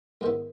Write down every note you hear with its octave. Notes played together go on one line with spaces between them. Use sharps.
G#2 D#3 G#3 B3 E4